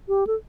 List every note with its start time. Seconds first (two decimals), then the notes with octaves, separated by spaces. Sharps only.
0.08 G4
0.27 A4